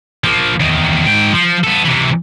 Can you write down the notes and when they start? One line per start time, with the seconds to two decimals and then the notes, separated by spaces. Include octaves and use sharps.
0.24 F3 A#3
0.60 E2 D#3
1.07 G#2 G5
1.33 F3
1.64 B3 A4
1.84 C3 E3